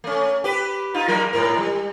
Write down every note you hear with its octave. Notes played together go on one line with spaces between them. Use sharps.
A3 C#4
G4 B4
D#4 F4
F#3 G3 A#4
G#2 A#4
G3